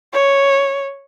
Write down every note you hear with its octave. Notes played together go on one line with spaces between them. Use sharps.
C#5